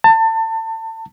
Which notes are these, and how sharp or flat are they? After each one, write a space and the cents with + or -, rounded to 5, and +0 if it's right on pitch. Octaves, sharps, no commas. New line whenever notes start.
A5 +30